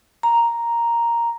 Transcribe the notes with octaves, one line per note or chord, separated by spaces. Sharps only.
A#5